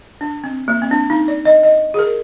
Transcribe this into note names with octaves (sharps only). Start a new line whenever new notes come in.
D4
C4
A#3
C4
D4
D#4
D5
D#5
D#5
G#4
A#4